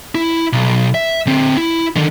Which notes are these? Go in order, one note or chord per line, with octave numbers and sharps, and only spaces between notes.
E4
B1
E5
D3 C4
E4
D3 D#3